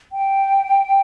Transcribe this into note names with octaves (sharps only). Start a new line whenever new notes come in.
G5